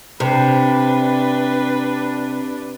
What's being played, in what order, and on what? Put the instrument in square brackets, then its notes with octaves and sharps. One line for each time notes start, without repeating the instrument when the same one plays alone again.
[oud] C3 [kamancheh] D4 B4